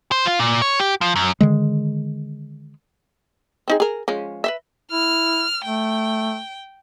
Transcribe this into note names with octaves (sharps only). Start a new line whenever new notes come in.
C5
F4
A#2
C#5
G4
F3
F#2
D3 D#3 G#3
C4 D#4 G#4
G#4 A#4
F3 G#3 C#4
B4 C5 E5
E4 F6
A3 G5